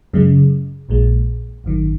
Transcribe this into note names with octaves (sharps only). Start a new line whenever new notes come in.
F#2 C#3 G#3
A#1 A#2 G#3
G#1 F#2 D#3